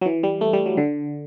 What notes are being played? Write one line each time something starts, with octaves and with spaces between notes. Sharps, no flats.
F#3
E3
G3
A3
G3
F#3
D3